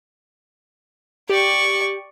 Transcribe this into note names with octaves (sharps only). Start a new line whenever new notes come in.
G4 D5 C#6